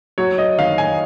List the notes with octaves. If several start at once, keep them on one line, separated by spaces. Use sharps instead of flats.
F#3 C#5
D#5
D#3 F5
G#5